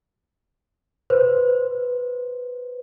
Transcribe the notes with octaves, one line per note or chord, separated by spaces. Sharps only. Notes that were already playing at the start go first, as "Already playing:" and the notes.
B4 C5